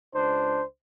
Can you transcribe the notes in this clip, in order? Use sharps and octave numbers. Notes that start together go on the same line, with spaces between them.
C#2 D4 C5